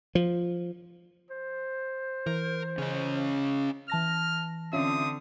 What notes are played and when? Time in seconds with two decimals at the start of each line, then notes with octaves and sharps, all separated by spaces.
0.15 F3
1.30 C5
2.27 E3 A#4
2.78 C#3 C#4 D#5
3.90 E3 A5 F6 A#6
4.73 D3 C4 C#4 F4 E5 D#6